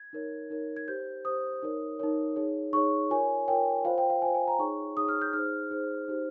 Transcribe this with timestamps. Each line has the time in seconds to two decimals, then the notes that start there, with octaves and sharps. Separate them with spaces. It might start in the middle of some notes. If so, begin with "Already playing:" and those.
Already playing: G#6
0.13 D#4 A#4 C#5
0.50 D#4 A#4 C#5
0.76 G#6
0.88 G4 C5 G6
1.25 G4 C5 D#6
1.63 D#4 A#4 C#5
1.99 D#4 A#4 C#5
2.36 D#4 G#4 C#5
2.73 D#4 G#4 C#5 C#6
3.10 F4 A#4 C#5 G#5
3.48 F4 A#4 C#5 G5
3.85 F4 C5 F5
3.98 G5
4.10 F5
4.22 F4 C5 G#5
4.35 G#5
4.47 A#5
4.59 D#4 G#4 C#5 C#6
4.97 D#4 G#4 C#5 D#6
5.08 F6
5.22 G6
5.33 D#4 G#4 C5 F6
5.70 D#4 G#4 C5
6.08 D#4 G4 C5